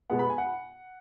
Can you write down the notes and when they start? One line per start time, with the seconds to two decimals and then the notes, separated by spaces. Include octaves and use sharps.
0.10 B2 G#3 B3 F#5
0.19 B5
0.30 G#5
0.38 F#5